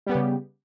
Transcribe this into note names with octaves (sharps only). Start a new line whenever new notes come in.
C#3 G3 B3 G4